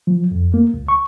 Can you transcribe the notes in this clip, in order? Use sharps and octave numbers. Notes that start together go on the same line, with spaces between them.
F3
F2
A#3
C#2
C#6